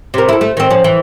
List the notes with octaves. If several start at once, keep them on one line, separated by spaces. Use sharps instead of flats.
C3 A#4
E4 A4
A3
D#3 C4
F3 C#4
E3